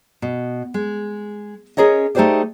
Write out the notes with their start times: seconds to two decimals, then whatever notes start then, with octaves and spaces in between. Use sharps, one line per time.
0.22 B2
0.74 G#3
1.77 C#4 G#4 A#4 C#5 D#5
2.15 A3 D#4 G4 G#4 C5 D5